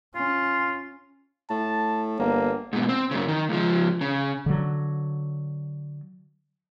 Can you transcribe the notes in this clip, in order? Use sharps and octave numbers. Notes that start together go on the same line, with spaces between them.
C#4 F4
A2 A5
G1 A#3
G#2 B2
C4
F#2 C#3
D#3
C#2 F3
C#3
D3 F#3